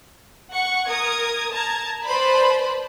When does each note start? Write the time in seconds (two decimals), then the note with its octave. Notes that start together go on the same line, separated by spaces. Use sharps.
0.52 F#5 C#6
0.87 A#4 D#6 G#6
1.54 A5 A#5 G#6
2.04 B4 C5 D5 A5 B5